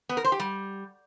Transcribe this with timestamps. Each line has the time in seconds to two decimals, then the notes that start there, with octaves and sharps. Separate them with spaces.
0.09 B3
0.17 A#4
0.24 C5
0.32 G4
0.40 G3